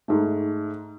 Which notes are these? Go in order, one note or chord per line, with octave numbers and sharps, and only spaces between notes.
G#2 A3